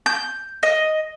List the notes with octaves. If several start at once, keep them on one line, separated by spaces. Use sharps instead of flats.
G6
D#5